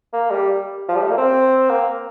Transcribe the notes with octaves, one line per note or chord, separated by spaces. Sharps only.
A#3
G3
F3
G3
A3
A#3
C4
A#3